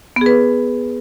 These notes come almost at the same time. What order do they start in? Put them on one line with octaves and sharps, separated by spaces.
B3 G#4 B4